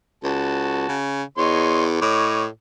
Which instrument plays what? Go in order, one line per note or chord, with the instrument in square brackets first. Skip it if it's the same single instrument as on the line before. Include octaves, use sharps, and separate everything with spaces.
[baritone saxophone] C#2 [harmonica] F#4 A5
[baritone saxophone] C#3
[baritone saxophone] E2 [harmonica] C#5 D#5 C6
[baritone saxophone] A2 [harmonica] C#5 D#5 D6